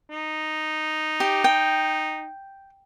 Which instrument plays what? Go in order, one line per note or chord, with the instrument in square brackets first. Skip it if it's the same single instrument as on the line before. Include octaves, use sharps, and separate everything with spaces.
[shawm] D#4
[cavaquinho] G4
G5